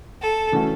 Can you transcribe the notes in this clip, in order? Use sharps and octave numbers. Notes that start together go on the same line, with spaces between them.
A4
C#3 E3 A3 C#4 F#4